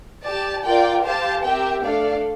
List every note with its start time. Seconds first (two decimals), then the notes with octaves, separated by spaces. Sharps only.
0.24 G4 D5 A5
0.63 F4 A#4 D5 G5
1.03 G4 C5 F5 A5
1.42 C4 G4 A#4 E5 G5
1.83 A3 D4 A4 D5 F5